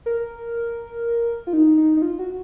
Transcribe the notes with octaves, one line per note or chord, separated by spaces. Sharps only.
A#4
F4
D#4
D#4
D#4
F4
F#4